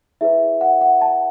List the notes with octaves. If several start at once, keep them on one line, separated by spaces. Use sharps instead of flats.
E4 G#4 B4 E5
F#5
F#5
A5